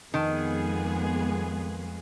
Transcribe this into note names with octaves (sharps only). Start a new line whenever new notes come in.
F2 D#3 G#3 B3 G#4